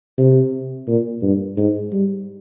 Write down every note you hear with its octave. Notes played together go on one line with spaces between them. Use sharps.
C3
A#2
G2
G#2
G3